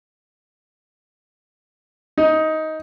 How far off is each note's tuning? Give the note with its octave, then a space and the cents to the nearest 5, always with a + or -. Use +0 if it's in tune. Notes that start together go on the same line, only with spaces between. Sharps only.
D#4 +15